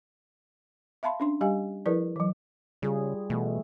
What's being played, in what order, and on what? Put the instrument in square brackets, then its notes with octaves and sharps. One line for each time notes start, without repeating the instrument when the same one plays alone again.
[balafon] E5 F5 A5 B5 C6
C#4 D4 C6
G3 G4 D#5 F5 G#5
F3 E4 G#4 A#4 B4 D5
E3 F#3
[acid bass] C#3 [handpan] G3 F4 G#4
[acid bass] B2 [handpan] E3 A3